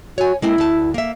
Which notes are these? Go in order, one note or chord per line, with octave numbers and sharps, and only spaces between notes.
F#4 C#5 G#5
G#3 A#3 C4 E4
D2 A5
A#3 E5